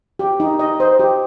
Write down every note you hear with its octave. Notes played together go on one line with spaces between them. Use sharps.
G4
D#4
D#5
C5
G4